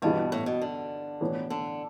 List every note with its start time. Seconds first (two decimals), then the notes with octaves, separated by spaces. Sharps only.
0.02 G2 B2 E3 B3
0.32 A2
0.46 B2
0.62 D3
1.21 A2 E3 B3
1.50 D3